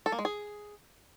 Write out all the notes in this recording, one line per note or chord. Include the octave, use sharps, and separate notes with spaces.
A4
A#3
G#3
G#4